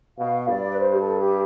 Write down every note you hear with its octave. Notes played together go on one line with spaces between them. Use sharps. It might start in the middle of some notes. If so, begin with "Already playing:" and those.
B2 F5
G2 D5
B4
C5
G4
A4
G4